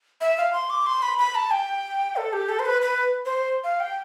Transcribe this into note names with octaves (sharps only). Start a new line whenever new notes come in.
E5
F5
C6
D6
C6
B5
B5
A5
G5
A4
G4
A4
C5
B4
B4
C5
F5
G5